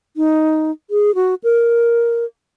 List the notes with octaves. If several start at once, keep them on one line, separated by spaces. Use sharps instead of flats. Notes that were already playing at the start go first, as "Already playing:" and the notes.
D#4
G#4
F#4
A#4